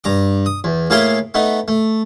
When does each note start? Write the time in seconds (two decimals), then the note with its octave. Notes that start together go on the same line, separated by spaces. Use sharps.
0.04 G2 A#5 D6
0.46 D#6
0.64 E2
0.90 A2 A#3 E4 G#4 F5 C6
1.34 A3 B3 D#4
1.68 A3